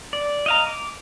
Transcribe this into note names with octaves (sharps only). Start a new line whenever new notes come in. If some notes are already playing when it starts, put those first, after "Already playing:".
D5
D#5 F5 A#5
D6